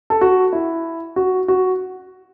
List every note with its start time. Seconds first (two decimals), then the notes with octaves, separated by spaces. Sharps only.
0.10 A4
0.21 F#4
0.53 E4
1.16 F#4
1.48 F#4